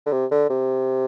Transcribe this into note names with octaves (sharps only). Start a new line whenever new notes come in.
D3
C3
D3
C3